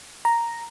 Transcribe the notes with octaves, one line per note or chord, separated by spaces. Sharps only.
A#5